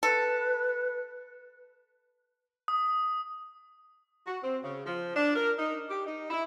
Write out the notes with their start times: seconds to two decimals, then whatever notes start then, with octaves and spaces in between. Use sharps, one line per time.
0.03 A4 B4
2.68 D#6
4.26 F#4
4.43 C4
4.64 C#3
4.86 F3
5.15 D4
5.36 A#4
5.58 D#4
5.90 G4
6.06 D#4
6.30 E4